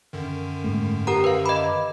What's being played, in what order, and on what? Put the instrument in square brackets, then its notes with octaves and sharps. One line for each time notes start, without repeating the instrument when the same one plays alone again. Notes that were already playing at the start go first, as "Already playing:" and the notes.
[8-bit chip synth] F#2 D3 D#3
[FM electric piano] G#2 A3
[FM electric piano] G4 F#5 [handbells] A#4 A#5
[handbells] B4 F5
[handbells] D#5 B5 [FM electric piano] D6